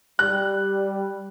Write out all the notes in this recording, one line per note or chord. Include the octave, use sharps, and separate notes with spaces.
G3 F#6